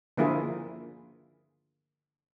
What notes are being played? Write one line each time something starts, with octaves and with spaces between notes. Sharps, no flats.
D3 F3 A#3 E4 F4 G#4